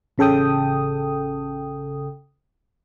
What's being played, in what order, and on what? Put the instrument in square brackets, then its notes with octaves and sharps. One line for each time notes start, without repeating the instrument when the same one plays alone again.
[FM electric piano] A1 C#3 A4 G5 D#6